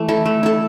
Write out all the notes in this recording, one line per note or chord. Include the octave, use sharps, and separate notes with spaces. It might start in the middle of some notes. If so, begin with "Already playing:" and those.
Already playing: E3 A3
E4 A4
A3
E4 A4